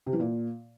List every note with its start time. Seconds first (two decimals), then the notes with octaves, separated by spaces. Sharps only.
0.06 C3
0.13 E3
0.19 A#2